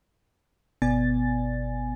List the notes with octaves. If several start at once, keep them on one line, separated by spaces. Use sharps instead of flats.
G1 B2 B3 D5 G#5 A6